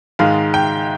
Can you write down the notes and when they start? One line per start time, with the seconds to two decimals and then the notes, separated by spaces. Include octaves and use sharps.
0.19 G#2 D#3 G#3 F5
0.54 G5